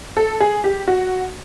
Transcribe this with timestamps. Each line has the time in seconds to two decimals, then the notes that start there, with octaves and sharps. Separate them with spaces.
0.17 A4
0.40 G#4
0.64 G4
0.88 F#4